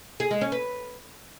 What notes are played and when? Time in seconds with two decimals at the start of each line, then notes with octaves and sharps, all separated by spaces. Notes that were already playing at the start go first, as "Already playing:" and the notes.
0.20 G#4
0.31 G#3
0.41 C#4
0.52 B4